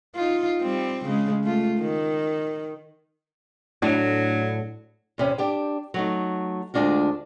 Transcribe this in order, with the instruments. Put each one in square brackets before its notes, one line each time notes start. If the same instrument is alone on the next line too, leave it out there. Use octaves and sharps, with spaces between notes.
[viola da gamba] D#4 F4
G3 C4
C#3 G#3
A3 F4
D#3
[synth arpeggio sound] A2 [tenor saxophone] F#3 [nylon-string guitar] D4
[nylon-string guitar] E2 C3 C#4
D4 G4 G5
F#3 A3 D#4
D2 G#3 D4 F4 F#4